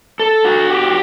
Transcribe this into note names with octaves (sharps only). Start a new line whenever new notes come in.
A4
F#4
G4